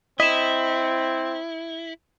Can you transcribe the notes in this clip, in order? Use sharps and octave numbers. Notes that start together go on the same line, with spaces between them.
C4 E4 D#5 B6 E7